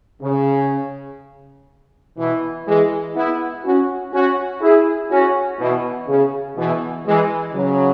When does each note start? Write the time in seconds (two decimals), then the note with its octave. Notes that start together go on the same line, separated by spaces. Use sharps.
0.23 C#3
2.18 B2 E3
2.67 E3 G#3
3.16 B3 E4
3.65 C#4 F#4
4.13 C#4 F#4
4.62 E4 G#4
5.11 C#4 F#4
5.60 B2 E3
6.08 C#3
6.57 B2 E3
7.06 E3 G#3
7.55 C#3 F#3